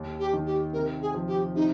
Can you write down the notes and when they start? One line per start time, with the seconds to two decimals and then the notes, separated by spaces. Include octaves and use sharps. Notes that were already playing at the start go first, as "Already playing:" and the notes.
Already playing: D#2
0.19 G4
0.33 D#3
0.46 G4
0.73 C3 A#4
1.01 G#4
1.14 F3
1.28 G4
1.55 C3 D#4